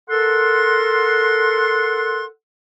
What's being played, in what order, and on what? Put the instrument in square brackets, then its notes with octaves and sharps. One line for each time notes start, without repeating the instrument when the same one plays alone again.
[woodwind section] A4 A#4 F#5 C6